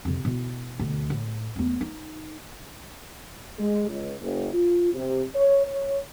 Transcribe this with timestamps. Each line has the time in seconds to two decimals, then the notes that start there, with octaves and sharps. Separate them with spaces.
0.05 F2 C3
0.25 B2 E4
0.79 D2 B2
1.10 A2
1.56 E2 A3
1.81 D#4
3.59 G#3
3.89 C#2
4.20 F#1
4.54 F4
4.94 C3
5.34 C#5
5.67 C#5